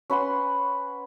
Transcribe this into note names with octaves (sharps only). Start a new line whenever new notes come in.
C#4 B4 F#5 C6